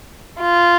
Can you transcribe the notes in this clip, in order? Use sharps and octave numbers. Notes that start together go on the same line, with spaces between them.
F4